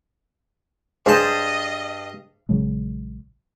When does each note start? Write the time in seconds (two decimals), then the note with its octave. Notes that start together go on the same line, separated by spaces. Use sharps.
1.06 G2 G#4 C5 D#5 A5
2.49 A#1 C#3 F#3 G#3